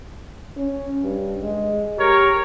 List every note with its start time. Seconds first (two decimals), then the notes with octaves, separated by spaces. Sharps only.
0.57 C#4
1.02 G2
1.43 G#3
1.98 G4 A#4 C#5